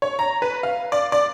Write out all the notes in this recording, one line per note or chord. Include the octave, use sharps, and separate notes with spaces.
C#5
A#5
B4
F5
D5
D5